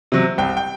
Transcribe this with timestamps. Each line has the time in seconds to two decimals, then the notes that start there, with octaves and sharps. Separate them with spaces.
0.12 C3 F#3
0.38 C2 G5
0.57 G5